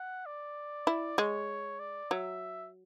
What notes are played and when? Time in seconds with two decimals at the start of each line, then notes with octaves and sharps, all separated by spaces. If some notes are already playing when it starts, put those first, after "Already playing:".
Already playing: F#5
0.26 D5
0.87 E4
1.18 G#3 C#5
1.79 D5
2.11 F#3 E5